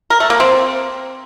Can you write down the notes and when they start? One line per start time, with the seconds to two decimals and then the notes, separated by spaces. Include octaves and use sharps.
0.10 A#4
0.20 A3
0.30 A#3
0.40 C4